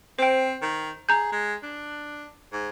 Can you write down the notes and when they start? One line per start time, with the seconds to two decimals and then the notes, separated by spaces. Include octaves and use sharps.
0.19 C4 C5 G5
0.62 D#3
1.09 G#4 A#5 G6
1.32 G#3
1.63 D4
2.52 G#2